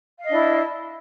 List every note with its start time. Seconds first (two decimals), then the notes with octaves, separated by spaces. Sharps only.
0.19 F5
0.23 D#5
0.28 D4
0.32 E4